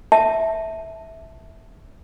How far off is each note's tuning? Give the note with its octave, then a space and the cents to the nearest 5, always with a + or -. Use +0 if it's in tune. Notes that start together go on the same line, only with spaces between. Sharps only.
E5 -15 A5 +0